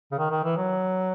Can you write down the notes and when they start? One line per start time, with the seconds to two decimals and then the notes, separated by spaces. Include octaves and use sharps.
0.11 C#3
0.18 D#3
0.31 D#3
0.44 E3
0.56 F#3